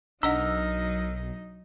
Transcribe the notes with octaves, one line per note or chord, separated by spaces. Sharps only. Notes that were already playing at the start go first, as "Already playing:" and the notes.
B1 F#3 D4 D#4 A#4 D#5 F#5 E6